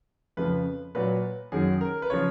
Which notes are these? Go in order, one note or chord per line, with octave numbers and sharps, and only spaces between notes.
F2 C#3 F3 B4
A#2 F#3 B4
F#2 D#3 F#3 G#4
A#4
B4
C#3 F3 C#5